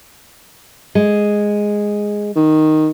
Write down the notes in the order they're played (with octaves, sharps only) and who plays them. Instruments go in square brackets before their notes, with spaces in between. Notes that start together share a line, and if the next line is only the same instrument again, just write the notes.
[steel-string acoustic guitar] G#3
[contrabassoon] D#3